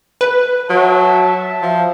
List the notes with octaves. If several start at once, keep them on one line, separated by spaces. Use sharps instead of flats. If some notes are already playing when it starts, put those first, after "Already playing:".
B4
F#3 E5 A5
F3